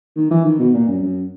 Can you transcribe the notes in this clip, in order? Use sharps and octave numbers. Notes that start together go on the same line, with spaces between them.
D#3
E3
D#3
B2
A#2
F#2
F#2